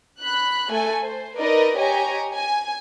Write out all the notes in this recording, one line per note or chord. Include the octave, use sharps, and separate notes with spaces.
B5 F#6
A3 A4 G#5
C5
D#4 A#4 B4 D5 D#5
G4 C#5 D#5 G#5 A#5
G#5